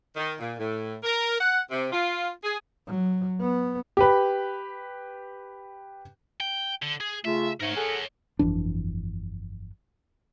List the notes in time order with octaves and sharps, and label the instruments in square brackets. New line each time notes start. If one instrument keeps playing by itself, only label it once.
[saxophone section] D#3
A#2
A2
A#4
F#5
C3
F4
G#4
[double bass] F#3
B3
[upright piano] G4 B4
[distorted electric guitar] G5
D3
G#4
[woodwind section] C#3 A3 F4 [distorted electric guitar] E5
[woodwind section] G#2 A3 [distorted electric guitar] A#4 C#5
[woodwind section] G#4 A4 F#5
[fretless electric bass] G1 F2 E3 D4